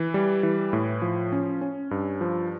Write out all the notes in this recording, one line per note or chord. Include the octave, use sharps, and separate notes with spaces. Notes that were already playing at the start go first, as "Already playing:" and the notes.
Already playing: E3
G3
E3
A2
F3
C#4
C#4
G2
F3